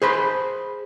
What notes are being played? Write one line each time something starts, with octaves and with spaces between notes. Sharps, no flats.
G#4 C5 B5